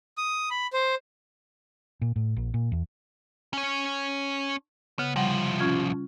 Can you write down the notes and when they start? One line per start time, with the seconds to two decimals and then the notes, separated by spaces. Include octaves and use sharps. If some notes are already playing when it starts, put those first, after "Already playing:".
0.18 D#6
0.51 B5
0.73 C5
2.02 A#2
2.16 A2
2.37 A#1
2.54 A#2
2.72 E2
3.53 C#4 C#5
4.99 C#3 B3
5.16 C2 F3 G3 F#5
5.60 C#4 F4 G#6